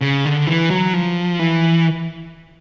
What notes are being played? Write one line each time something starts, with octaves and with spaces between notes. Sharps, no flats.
C#3
D3
E3
F#3
F3
E3